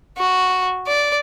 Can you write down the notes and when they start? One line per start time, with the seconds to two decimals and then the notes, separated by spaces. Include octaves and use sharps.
0.18 F#4
0.88 D5